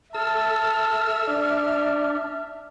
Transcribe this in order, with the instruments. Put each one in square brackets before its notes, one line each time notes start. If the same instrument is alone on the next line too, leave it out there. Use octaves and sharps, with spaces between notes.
[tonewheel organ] A4 E6 [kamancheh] E5 [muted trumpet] A5 [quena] F6
[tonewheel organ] D4 [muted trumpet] D5